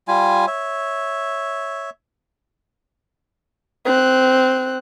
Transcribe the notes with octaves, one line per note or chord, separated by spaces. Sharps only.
G3 F4 G#5
C#5 E5
C4 F#6